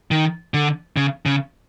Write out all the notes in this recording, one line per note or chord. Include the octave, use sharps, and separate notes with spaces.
D#3
D3
C#3
C#3